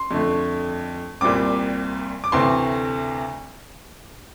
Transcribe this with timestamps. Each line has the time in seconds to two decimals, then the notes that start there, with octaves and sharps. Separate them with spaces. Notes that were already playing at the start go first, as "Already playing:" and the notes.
Already playing: C6
0.11 F2 D3 A3
1.21 C2 A#2 G3 C4 D6
2.24 D6
2.32 D2 C3 E3 A3 C4 C6